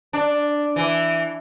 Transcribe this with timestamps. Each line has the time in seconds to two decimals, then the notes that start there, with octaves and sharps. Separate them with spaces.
0.13 D4
0.76 E3